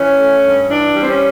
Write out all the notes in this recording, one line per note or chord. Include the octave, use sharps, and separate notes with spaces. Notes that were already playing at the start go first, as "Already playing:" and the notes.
Already playing: E3 C#4
A3
G2
E3 D4
G3
C4
C#4